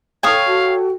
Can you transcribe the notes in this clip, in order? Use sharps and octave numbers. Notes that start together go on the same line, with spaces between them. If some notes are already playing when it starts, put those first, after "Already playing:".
A4 C#5 F5 G5 C#6 D#6
F#4